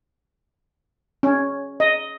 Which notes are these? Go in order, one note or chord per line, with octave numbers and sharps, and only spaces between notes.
C#4
D#5